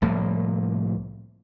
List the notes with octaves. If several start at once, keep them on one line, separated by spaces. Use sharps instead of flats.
C2 A2 F3 A#3